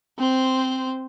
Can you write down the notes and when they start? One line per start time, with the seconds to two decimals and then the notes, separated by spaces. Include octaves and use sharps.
0.19 C4 C5